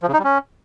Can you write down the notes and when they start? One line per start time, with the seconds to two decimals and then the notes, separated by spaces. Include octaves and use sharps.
0.03 F3
0.08 C#3
0.13 D#4
0.19 G3
0.24 C#4